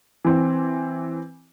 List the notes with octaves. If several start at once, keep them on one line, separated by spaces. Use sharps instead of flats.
E3 C4